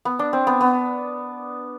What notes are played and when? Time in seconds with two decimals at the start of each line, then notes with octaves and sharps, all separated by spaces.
0.05 B3
0.19 D4
0.33 C4
0.47 B3
0.61 B3